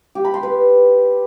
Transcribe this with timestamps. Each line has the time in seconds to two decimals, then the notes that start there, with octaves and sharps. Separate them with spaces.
0.15 G4
0.25 B5
0.34 C6
0.43 B4